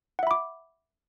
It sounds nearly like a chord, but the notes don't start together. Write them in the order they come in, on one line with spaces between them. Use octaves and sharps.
F#5 E5 B5 D6